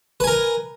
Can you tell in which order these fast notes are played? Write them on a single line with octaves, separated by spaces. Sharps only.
B4 G#5 A#4